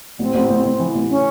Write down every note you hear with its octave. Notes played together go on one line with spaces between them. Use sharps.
A1 C4
A1
A1
A1
E3
A1
C#4